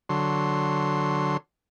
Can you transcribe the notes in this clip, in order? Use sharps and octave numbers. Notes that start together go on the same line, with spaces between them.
D3 F#3 C6